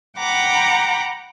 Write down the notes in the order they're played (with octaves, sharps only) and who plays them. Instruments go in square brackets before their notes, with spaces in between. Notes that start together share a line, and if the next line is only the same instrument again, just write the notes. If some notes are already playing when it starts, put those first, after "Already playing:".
[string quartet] F#5 G5 A#5 B5 D6